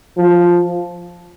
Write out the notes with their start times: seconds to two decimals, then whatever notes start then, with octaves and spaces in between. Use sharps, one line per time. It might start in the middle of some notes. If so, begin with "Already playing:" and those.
0.17 F3